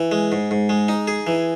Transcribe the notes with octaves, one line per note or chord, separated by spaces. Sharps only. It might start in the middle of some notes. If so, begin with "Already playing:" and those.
Already playing: E3
G#3
G#2
G#2
G#3
D#4
G#4
E3